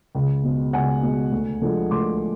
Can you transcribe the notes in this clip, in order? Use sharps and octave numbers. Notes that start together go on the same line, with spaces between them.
C#2
B2 G#3
C#2 F#5 G#5
B2 G#3
D2
D3 F3 G#3
D2 C6 D6